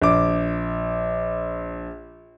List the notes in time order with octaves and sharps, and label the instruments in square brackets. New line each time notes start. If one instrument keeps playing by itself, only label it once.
[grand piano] A#1 D6